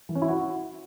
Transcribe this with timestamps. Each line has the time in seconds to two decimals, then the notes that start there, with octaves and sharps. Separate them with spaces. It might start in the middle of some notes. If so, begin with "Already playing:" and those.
0.09 E3
0.15 C#4
0.22 E4
0.28 F#4